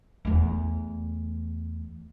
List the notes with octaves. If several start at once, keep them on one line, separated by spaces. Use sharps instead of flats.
E2 A3